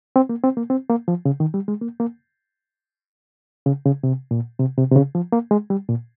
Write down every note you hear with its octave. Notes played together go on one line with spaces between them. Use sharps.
C4
A#3
C4
A#3
C4
A#3
F3
C#3
D#3
G3
G#3
A#3
A#3
C#3
C#3
C3
A#2
C3
C3
C3
C#3
F3
A#3
G#3
G3
A#2